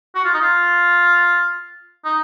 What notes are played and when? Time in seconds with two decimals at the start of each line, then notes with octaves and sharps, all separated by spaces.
0.15 F#4
0.25 F4
0.33 D#4
0.41 F4
2.05 D#4